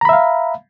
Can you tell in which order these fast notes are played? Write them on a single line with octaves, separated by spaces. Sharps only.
A#5 B5 E5 F5